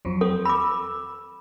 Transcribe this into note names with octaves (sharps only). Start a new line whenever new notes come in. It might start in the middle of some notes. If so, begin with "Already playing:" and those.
F2 F3 F#3
C4 A4
B5 D6 E6